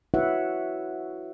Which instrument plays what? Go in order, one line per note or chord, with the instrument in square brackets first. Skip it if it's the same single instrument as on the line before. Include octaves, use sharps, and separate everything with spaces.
[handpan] E4 F#4 B4 C#5 E5 F#5